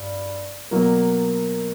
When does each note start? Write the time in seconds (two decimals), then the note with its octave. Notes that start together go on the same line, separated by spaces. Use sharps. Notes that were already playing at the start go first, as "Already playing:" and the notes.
Already playing: G2
0.71 B2 F#3 A#3